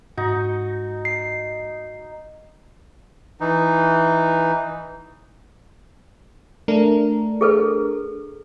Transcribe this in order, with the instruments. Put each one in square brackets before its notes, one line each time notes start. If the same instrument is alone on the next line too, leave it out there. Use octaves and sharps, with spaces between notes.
[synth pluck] G#2 [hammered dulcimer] D#4 [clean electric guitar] F#4
[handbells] C7
[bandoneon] E3 D#4
[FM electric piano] A3 D4 A#4
[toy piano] G#4 A4 B4